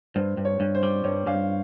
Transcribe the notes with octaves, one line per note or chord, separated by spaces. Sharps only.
G2 C5
G2
C#5
G2
C5
G3
G2 C#5
G2 F5